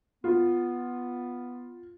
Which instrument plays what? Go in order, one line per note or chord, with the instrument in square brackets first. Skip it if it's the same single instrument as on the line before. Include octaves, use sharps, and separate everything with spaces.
[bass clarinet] B3 [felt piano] F4